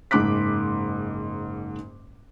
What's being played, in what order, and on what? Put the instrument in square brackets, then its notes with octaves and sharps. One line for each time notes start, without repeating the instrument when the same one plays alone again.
[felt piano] F#1 G#2 C6 D6 F#6 B6